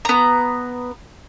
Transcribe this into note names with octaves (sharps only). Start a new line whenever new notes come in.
B3 A#5